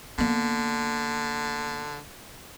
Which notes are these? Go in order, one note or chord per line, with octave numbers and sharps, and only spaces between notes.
D3 A#3 B3